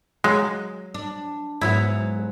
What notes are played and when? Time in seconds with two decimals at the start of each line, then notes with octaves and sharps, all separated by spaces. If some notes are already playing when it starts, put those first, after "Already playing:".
0.24 F#3 G#3
0.94 D4
1.61 G#2 F#3 B3 E4